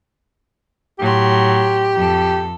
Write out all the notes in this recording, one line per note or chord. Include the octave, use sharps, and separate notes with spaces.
A2 F#3 G4 C6
F2 A4